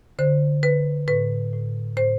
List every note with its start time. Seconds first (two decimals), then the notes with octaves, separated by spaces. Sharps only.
0.19 D3 C5
0.63 D3 B4
1.08 A2 B4
1.53 A2
1.97 A2 C5